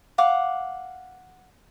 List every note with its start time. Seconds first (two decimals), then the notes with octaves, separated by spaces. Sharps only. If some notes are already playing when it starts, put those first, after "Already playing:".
0.18 F5 F#5 D6